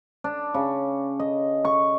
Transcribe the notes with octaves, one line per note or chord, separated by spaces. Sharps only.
D4
C#3
D#5
C#6